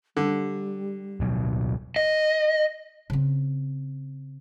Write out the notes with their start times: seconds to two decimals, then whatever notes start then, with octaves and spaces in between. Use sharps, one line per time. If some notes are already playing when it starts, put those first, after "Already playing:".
0.17 D3 G3
1.20 D1 B2 F#3
1.96 D#5
3.10 C#3 C4